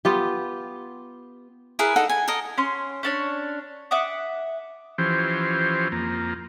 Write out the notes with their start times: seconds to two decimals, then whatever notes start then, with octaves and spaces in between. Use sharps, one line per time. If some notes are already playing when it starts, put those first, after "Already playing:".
0.05 B3 F4 G4
1.79 E4 G#4 A#4 B4
1.96 D#4 A4 F#5
2.09 G#5
2.28 A4 A#4 D#5
2.58 C#4 C6
3.03 C#4 D4 C#5
3.91 E5 F#5 D6 D#6
4.98 E3 F3 C#4 G4 C5
5.92 F2 A#3